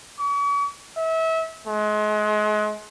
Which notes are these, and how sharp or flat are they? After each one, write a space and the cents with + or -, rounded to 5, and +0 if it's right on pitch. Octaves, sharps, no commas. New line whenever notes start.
C#6 +45
E5 -30
G#3 +35